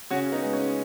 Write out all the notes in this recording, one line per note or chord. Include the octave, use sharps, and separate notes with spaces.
C#3 C#4 F#4
B3 D#4
G#3
C#4